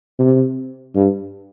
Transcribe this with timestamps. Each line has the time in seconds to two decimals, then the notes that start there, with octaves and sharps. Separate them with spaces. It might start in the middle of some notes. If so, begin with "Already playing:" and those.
0.19 C3
0.95 G2